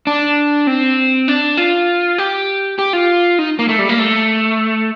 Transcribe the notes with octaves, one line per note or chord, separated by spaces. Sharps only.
D4
C4
D4
F4
G4
G4
F4
D#4
A#3
A3
G3
A#3
A3